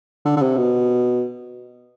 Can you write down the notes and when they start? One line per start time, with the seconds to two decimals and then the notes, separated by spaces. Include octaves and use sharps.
0.25 D3
0.36 D3
0.42 C3
0.57 B2